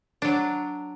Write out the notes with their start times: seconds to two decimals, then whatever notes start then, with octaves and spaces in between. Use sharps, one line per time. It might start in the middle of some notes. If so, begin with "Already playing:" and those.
0.22 F#3 D4